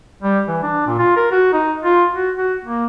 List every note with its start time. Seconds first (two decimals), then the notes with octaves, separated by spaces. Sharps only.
0.23 G3
0.48 E3
0.63 D4
0.87 A#2
0.99 F4
1.17 A#4
1.32 F#4
1.53 D#4
1.84 F4
2.15 F#4
2.37 F#4
2.65 A#3